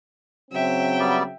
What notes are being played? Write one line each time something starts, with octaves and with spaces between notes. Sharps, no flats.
C#3 F#3 C4 E5 G5
G3 B3 D5